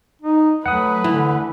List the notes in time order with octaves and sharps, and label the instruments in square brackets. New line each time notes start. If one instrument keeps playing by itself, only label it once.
[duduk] D#4
[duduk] F#3 [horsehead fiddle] A3 B4 [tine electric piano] F#5 D#6
[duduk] D3 [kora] E3